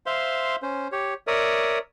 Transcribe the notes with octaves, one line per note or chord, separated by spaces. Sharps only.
C5 E5 F5 C6
C#4 C5
G4 C#5
A#4 C#5 D5 E5 D#6